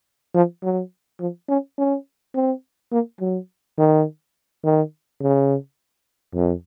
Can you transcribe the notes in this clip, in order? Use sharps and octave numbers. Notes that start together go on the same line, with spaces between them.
F3
F#3
F3
C#4
C#4
C4
A#3
F#3
D#3
D#3
C#3
F2